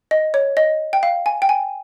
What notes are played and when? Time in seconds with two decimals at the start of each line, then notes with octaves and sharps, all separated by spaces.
0.11 D#5
0.34 C#5
0.57 D#5
0.93 G5
1.03 F5
1.26 G#5
1.42 G5
1.49 G#5